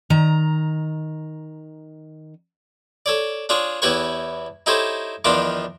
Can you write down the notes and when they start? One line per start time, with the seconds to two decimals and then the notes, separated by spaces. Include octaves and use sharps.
0.10 D#3 A#5
3.06 A4 C#5 D5
3.49 D4 F4 G#4 C#5
3.82 E2 E4 G4 B4 C#5 C#6
4.66 D#4 E4 G4 A4 C5 C#5
5.25 E2 D#3 F3 D4 F4 D6